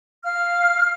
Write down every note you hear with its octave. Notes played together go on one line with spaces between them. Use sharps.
F5 F6